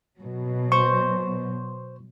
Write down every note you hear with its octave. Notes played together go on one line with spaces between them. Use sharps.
B2 F#3
C5 C#6